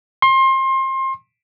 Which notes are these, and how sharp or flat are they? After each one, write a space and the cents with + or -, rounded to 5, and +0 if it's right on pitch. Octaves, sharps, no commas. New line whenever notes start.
C6 +30